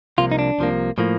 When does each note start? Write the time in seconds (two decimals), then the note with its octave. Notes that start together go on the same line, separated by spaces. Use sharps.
0.18 C2 C3 F3 A#3 F4
0.32 D#4
0.39 D4
0.58 C2 C3 F3 A#3
0.98 A2 F3 A#3